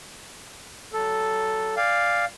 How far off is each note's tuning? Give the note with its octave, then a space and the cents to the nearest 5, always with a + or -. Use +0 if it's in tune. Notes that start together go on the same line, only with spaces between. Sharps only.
F#3 +35 A4 +0
D5 +0 F5 +0 G#5 -45